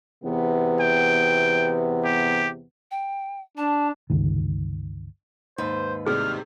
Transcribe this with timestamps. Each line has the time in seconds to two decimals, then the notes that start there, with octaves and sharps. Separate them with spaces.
0.23 E2 C3 B3
0.81 G5
2.05 G4
2.91 G5
3.57 D4 A5
4.10 G1 C#2 D#3
5.58 D#2 G#2 B4 C5
6.07 A2 C3 G3 G#4 F6